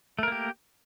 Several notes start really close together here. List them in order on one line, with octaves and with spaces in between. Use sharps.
A3 A#4 A#3 G4